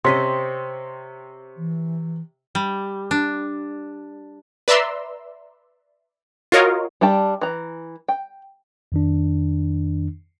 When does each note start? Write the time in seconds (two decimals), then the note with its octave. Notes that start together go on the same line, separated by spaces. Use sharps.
0.04 C3 C4 C#4 C5 D#5 C6 B6
1.57 E3
2.55 G3
3.11 D4
4.68 B4 D5 E5 A#5 C6 E6
6.52 F4 F#4 A#4 C#5 D#5 F5
7.01 G3 D4 G5 A5
7.42 E3 A#5
8.09 G5
8.92 F2 D#3 D4